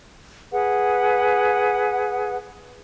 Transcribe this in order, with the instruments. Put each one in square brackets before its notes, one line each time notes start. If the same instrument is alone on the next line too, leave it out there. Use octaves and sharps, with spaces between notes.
[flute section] G#4 B4 F#5